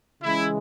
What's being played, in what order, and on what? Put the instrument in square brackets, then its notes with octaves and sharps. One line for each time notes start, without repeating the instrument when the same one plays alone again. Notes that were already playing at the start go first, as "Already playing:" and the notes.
[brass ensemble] C#3 E3 G#3 E4